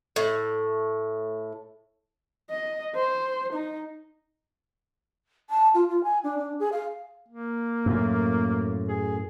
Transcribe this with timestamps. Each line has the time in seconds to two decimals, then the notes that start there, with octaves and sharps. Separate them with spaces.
0.16 A2
2.51 D#5
2.96 C5
3.53 D#4
5.50 A5
5.74 F4
5.89 F4
6.04 G#5
6.24 D4
6.38 D4
6.59 G#4
6.72 F5
7.28 A#3
7.86 F#2 A2
8.88 G#4